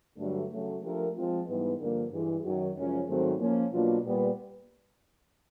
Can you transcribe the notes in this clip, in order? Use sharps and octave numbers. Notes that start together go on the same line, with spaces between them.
G2 D3 F#3 A3
C#3 F#3 A3
F3 A3 D4 G4 A#4
F3 G#3 C4 F4
G#2 E3 G3 B3
G2 D3 F3 A#3
G2 E3 G#3
F#2 D#3 F#3
F#2 C#3 F3 G#3 C#4
G#2 D#3 F#3 A3 C4
F3 A#3 C#4
B2 F#3 A#3 D4 F4
A#2 G3 B3